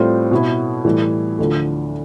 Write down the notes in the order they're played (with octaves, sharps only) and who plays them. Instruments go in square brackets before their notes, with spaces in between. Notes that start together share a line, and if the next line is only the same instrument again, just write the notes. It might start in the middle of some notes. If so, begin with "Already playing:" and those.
Already playing: [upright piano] A2 G3 C4 F4
B2 B3 E4
A2 E3 G3
D2 D3 F3